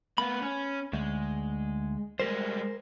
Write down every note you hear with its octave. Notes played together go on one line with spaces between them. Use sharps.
A#3 B3 B5
C#4
D2 G#3
G3 G#3 A#4 C5